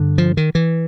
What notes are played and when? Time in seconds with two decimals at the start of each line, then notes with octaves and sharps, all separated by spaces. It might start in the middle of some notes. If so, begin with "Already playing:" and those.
Already playing: G2 D3
0.18 F3
0.37 D#3
0.55 E3